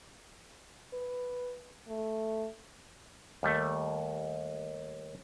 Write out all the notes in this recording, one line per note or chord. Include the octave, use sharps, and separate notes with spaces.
B4
A3
D#2 G3 A3